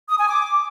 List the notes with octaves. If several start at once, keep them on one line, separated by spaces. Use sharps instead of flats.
D#6
G#5
D6